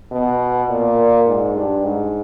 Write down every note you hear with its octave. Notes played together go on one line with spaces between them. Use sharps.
B2
A#2
G#2
G2
G#2